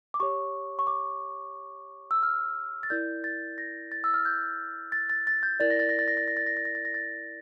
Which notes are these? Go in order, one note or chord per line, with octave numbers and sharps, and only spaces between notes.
D6
G4 C#5 C#6
C#6
D6
E6
F6
A6
E4 A#4 D5 G6
A6
A#6
A6
E6
F6
G6
A6
A6
A6
G6
E4 A#4 D5 A6
A#6
A6
A#6
A6
A#6
A6
A#6
A6
A#6
A6
A#6
A6
A#6
A6